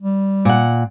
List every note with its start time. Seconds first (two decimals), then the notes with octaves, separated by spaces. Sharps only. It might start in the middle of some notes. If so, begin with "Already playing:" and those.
0.02 G3
0.45 A#2 F#5